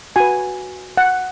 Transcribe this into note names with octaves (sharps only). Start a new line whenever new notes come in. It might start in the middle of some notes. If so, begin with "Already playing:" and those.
F#4 B4 G#5
F#5